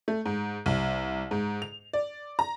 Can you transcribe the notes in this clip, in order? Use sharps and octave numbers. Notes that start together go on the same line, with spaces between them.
A3
G#2
C2
G#2
F7
D5
A#5